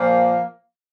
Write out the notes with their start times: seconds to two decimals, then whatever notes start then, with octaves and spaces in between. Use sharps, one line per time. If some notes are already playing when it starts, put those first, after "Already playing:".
Already playing: A#2 F3 A#3